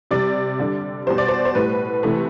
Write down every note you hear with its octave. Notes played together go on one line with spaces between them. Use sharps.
C3 G3 D5
D3 G3
B2 G3 C5
D5
C5
C5
A2 G3 B4
C3 E3 A3